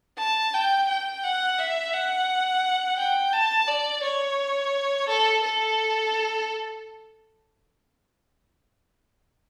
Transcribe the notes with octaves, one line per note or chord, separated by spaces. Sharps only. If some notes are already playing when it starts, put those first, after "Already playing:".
A5
G5
G5
F#5
E5
F#5
G5
A5
D5
C#5
A4
A4